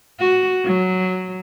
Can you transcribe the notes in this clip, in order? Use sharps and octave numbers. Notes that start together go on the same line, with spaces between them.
F#4
F#3